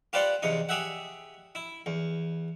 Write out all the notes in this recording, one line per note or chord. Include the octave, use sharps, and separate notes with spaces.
F4 G4 B4 C5 D5 F#5
E2 C3 D#4
G4 G#4 E5 F#5
E4
E2